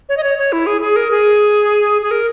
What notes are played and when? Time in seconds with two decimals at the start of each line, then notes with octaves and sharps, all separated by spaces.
0.09 C#5
0.17 D#5
0.23 C#5
0.38 C#5
0.53 E4
0.67 G#4
0.81 G#4
0.96 A#4
1.11 G#4
2.02 G#4
2.11 A#4